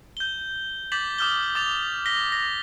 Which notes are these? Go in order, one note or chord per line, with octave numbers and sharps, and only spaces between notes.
G6 G7
D6 G6 A6 B6 F#7
D6 D#6 F6 G6 G7
D6 A6 F7
A#6 B6 G7
A#6